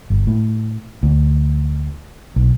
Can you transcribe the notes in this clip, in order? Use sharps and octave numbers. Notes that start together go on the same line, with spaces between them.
G1
A2
D2
B1